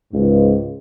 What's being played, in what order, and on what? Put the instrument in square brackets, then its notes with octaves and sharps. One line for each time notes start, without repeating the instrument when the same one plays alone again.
[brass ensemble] C#2 G#2